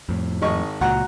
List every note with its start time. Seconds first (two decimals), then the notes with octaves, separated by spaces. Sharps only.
0.09 F2 A2
0.42 G#1 D#5 C#6
0.81 C#2 A#2 F#4 F#5 A#5